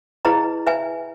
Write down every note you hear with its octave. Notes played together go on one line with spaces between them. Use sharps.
E4 G#4 B4 D#5 A#5
B4 E5 G#5